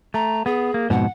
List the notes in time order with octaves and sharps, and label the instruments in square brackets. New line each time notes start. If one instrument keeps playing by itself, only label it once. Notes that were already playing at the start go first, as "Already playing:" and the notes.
[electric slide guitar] A3 [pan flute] A#5
[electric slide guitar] B3 [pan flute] G#4
[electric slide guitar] A#3
[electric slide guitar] F2 G#2 B2 [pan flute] F#5